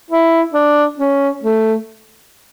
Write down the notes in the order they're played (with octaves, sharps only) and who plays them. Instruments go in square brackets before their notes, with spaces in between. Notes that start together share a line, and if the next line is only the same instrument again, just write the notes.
[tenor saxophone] E4
D4
C#4
A3